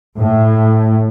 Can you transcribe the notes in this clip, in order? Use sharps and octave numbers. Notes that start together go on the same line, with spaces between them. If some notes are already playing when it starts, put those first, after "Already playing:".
A2